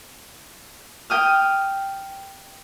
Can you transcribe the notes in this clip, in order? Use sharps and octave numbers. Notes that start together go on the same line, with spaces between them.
G5 D#6 F6